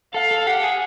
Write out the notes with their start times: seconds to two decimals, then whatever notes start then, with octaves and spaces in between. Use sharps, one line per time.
0.14 A4 F5
0.31 A4
0.47 G4 F#5
0.63 G#4